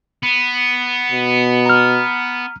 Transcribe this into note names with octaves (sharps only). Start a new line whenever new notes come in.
B3
B2
A#5 F6